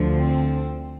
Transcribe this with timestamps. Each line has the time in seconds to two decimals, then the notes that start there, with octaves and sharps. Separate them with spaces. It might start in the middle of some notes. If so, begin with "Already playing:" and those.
Already playing: D2 D3 F3
0.14 C4